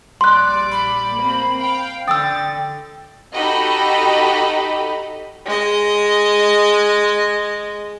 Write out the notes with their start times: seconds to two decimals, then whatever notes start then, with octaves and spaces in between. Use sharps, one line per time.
0.21 A#1 G3 D5 C6 F#6
0.71 B5
1.18 A#3 C4
1.58 F5 G5
2.08 D3 G5 D#6 E6 A6
3.34 D#4 F#4 G4 A4 D#5 B5
5.46 G#3 D#5